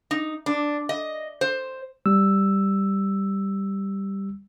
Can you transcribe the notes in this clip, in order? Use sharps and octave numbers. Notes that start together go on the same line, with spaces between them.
D#4
D4
D#5
C5
G3 E6